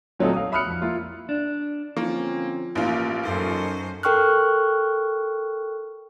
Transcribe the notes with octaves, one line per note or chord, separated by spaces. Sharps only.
A#2 F#3 A3 C4 D#4 A4
F5 D#6
E5 B5 D#6 F6 F#6 C#7
F2
A#3 E4 F4
D4
D3 F3 A#3 C4 C#4
A1 A#3 F4
F#2 D#4 A4 A#4 C5
A4 A#4 G5 C#6 F6 F#6